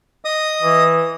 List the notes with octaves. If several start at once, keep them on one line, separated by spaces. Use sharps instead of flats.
D#5 D#6
E3